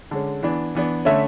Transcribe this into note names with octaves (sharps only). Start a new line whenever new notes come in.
D3 G#3 C#4
E3 B3 D4
E3 B3 D4
D3 A3 C#4 E5